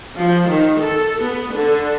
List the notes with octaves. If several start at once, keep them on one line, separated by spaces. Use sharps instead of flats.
F3
D#3
A4
B3
D3